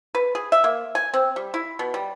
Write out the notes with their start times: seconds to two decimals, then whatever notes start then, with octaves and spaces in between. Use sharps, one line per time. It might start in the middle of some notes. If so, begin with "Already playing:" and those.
0.15 B4
0.35 G#4
0.52 E5
0.64 A#3
0.95 G#5
1.14 C4
1.36 G3
1.54 E4
1.79 B2
1.94 G3